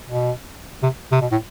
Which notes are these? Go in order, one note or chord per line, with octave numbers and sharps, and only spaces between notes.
B2
C3
C3
B2
A2